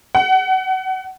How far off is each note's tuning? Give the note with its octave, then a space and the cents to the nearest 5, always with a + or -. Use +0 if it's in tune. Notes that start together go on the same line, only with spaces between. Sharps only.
F#5 +35